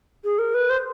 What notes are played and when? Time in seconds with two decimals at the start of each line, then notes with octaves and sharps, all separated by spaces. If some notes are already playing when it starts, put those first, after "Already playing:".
0.24 G#4
0.39 A#4
0.54 B4
0.70 C5